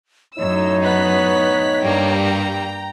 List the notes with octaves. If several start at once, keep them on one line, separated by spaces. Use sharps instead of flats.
F#2 A2 D#4 C#5 E6
B3 F#6 B6
G2 G3 A#3 G5 A#5